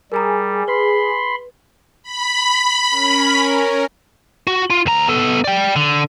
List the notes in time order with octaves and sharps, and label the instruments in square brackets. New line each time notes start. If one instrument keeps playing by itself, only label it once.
[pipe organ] G3 [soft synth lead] G#4 [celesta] A#4 G#5 A#5
[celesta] B4 [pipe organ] B5 C6
[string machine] B5
[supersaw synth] C#4 A#4
[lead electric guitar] F#4
F4
D2 A#5
B3 A4
D5 G5
D3